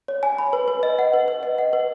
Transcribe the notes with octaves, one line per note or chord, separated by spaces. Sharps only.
C#5
G#5
B5
B4
B4
D#5
F#5
B4
B4
D#5
F#5
B4